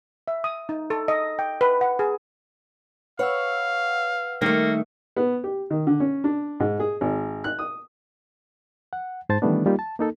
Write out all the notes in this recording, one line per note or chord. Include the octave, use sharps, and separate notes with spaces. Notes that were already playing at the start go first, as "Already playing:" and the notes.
E5
D#6
D#4
A4
D#5
G5
B4
F#5
G#4
B4 C#5 F5 F#5 E6
D#3 G3 A3 A#3
B3
G4
D#3
D3
C#4
D4
G#2
G#4
G#1
F#6
D#6
F#5
G#2 C5 A5 A6
D#3 E3 G3 A3 B3 D4
G3 A#3 D#4 F4 G4
A5
A#3 D#4 A4